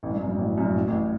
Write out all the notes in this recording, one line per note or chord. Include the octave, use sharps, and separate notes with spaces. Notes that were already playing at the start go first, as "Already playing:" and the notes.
A1 A2
G2
F#2
G2
A1 A2
F#2
G2
A1 A2
A1 A2